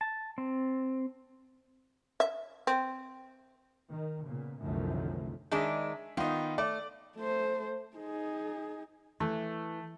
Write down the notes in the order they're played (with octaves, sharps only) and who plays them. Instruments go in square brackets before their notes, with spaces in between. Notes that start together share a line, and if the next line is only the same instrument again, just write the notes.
[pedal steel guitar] A5
C4
[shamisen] E5
C4
[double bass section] D#3
A#2 C#3 B3
C2 F#2 D3 D#3 F3 A3
[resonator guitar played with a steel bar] D#3 G#3 D4 [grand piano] G#4 E5
[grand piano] D#3 B3 D#4 [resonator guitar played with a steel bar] F4
[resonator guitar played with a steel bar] A3 [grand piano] D5
[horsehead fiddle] A3 C5
D#4 G#4
[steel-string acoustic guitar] E3 [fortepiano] A3